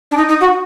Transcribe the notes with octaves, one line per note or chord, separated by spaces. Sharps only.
D4
D#4
D#4
F#4